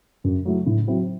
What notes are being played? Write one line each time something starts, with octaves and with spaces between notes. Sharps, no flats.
F#2
F#3 A3 E4
A2
F#3 C4 E4